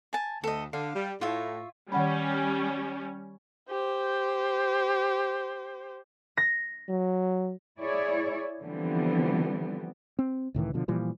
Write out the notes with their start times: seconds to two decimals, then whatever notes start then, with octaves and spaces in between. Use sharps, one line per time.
0.13 G#5 A5
0.44 D2 A4 D#5
0.73 D3 F5
0.96 G3
1.21 A2 F4 C#5 E5
1.92 D#3 G3 C#4 F#5 B5
3.70 G4 C5
6.37 A#6
6.89 F#3
7.80 E4 G#4 C#5 D5
8.62 D3 E3 F3 G3 B3 C4
10.19 C4
10.54 C#2 A2 D#3 E3
10.74 B2 D3 F3
10.88 A#2 E3 F3 G3